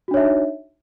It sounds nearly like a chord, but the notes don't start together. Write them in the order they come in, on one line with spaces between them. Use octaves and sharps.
F#4 D4 C#5 E5 D#4